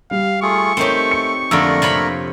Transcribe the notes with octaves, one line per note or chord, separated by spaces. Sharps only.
G3 F5
A3 F4 G#4 C#6
A3 C4 D#4 G4 A#4 C#5
C#7
F2 D3 A3 A#3 A#4 D5 E6
C3 C#5 B5